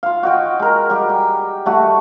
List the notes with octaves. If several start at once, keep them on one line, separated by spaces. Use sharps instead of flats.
F4 F5
F#4 D#5 G5
G#3 A#4
G3 G4
G5
G3 A3 F#4